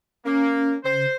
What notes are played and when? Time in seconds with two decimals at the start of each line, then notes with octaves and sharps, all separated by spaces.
0.25 A#3 C#4
0.84 C#3 C5